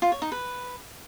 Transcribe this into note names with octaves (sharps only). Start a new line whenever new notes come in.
F4
C#5
D#4
B4